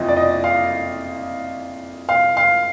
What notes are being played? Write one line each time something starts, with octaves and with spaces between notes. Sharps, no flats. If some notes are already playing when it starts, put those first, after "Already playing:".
Already playing: F#1 F2 F3 D#5
D5
D#5
F5
F5
F5